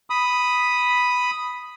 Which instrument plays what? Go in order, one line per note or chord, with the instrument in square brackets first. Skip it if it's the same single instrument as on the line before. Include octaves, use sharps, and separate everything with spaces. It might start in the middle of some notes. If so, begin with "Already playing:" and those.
[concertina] B5 D#6